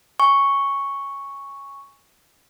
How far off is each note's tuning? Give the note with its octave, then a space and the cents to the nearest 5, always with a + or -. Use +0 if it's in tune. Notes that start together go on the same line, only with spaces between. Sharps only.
G#5 -15 C#6 +0